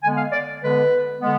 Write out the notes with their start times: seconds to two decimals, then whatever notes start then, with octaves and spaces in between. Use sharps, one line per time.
0.03 D3 G#3 B3 G#5
0.18 F5
0.32 D5
0.62 D3 G#3 B3 B4
1.20 D3 G#3 B3